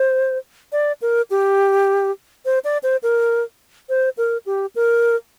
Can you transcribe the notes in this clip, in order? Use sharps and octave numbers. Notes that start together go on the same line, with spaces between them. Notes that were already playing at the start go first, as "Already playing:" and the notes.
Already playing: C5
D5
A#4
G4
C5
D5
C5
A#4
C5
A#4
G4
A#4